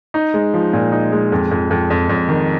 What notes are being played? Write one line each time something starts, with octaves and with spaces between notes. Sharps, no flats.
D#4
G#3
F3
A#2
D#4
G#3
F2
F2
F2
F2
F2
D#3